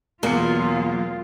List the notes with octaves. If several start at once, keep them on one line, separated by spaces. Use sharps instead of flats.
E2 B2 F#3 A#3 F4 C#7